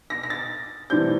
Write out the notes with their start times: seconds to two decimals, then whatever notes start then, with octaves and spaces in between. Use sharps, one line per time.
0.10 A#6
0.23 A#6
0.30 A6
0.90 A2 E3 G3 C4 G6